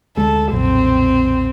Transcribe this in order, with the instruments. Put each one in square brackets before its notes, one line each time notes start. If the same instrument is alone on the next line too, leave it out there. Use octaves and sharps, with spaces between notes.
[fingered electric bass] D2 G#3 [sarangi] A4
[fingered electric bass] B1 F2 A#2 [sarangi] C4